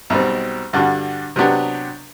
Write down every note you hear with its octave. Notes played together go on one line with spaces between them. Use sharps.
B1 B2 G3 C4
G2 D3 G3 D4 F#4
C3 F#3 B3 D4 G4